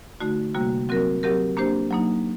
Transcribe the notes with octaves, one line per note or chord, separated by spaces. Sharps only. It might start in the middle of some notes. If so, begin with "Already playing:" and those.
D3 A3 D#4 F#4
C3 G3 A#3 F#4
F#3 C4 F#4 A#4
F#3 C4 G4 A#4
A#3 D4 G4 C5
F#3 A#3 D#4